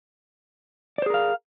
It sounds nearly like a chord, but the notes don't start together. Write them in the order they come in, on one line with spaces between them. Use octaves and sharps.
D5 C5 G#4 A#4 F5